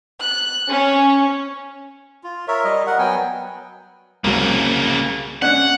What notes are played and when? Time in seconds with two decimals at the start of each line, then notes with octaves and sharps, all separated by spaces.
0.20 F#6
0.69 C#4
2.24 F4
2.48 A#4 C#5 E5
2.64 G3 D#5
2.86 A#4 F#5
2.99 F#3 B3 G5 G#5
4.24 C2 C#3 F#3 A#3
5.42 C#4 D4 F#5 F#6